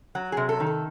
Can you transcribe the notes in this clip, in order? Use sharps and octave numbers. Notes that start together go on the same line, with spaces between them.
F#3 F#4
C3 G#4
A4
D#3
A4